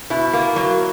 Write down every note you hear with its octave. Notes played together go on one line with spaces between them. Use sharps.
B2 E4
A#3
F#3